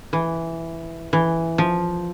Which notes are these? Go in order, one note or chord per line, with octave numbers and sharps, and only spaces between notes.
E3
E3
F3